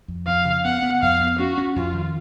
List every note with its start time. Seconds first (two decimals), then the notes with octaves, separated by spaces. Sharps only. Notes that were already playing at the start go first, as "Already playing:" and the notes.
0.08 F2
0.27 F2 F5
0.45 C#3
0.65 B3 F#5
0.82 B3
1.02 F2 F5
1.21 B3
1.39 C#4 F#4
1.58 C#4
1.76 F2 F4
1.94 D#3